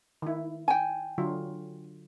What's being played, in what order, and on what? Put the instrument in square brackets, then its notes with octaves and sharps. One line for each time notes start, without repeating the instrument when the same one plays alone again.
[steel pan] D#3 E4
[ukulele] G5 G#5
[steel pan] D3 F#3 F4